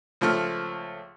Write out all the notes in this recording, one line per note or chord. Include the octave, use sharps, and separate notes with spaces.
C#2 F3 A3 F6